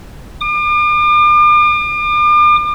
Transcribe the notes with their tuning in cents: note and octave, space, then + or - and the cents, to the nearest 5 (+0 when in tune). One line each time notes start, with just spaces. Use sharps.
D6 +40